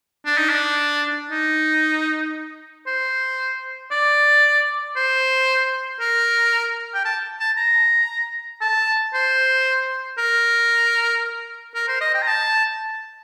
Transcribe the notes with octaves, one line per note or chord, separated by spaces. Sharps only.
D4
D#4
D4
D#4
C5
D5
C5
A#4
G5
A5
A5
A#5
A5
C5
A#4
A#4
C5
D#5
G5
A#5
A5